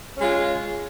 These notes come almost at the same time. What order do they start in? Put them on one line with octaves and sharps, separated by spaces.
C#4 G#3 F4